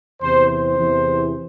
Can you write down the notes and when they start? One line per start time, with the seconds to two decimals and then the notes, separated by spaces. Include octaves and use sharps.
0.21 E2 C3 E3 C5
0.49 C5
0.78 E2 C3 E3